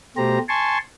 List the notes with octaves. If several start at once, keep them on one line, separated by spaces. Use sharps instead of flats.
B2 A3 G4 C5 A#5
G#5 A5 C6 C#6